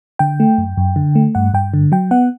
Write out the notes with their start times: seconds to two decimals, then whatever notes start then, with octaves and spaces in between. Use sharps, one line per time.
0.19 D3 G5
0.40 A3
0.58 F#2
0.77 F#2
0.96 D3
1.15 A3
1.35 G2 F#5
1.54 G2 G5
1.74 D3
1.92 F#3 G5
2.11 B3 F#5